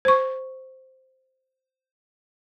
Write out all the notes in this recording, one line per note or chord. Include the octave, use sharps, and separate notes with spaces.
C5 C#6